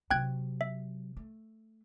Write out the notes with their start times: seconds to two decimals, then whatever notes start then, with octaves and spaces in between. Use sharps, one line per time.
0.11 C3 F#3 G5 F#6 G#6
0.61 E5
1.17 A3